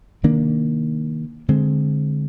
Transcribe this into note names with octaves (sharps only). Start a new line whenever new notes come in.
C3 D#3 A#3 D4
D3 G#3 C4